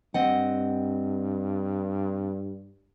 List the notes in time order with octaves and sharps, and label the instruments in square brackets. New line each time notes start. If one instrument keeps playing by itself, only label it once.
[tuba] G2 [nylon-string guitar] C4 D#5 F#5